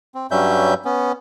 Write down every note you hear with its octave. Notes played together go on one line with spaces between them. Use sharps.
C4
G2 F#3 G3 C#4 E5 G6
B3 C#4